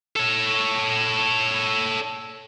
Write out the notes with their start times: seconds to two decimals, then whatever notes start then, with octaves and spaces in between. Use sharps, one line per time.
0.16 A4 C#5